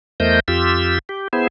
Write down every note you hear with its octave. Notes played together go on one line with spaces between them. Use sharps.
E2 A3 A#4 C5 D#5 G6
F2 F4 G4 E6
G4
B3 E4 G#4 C5